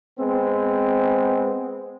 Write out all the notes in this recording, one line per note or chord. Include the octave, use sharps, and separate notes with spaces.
G#3 B3 C4